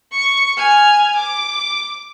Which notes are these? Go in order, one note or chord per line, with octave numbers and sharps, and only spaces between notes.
C#6
G#5 F6
D6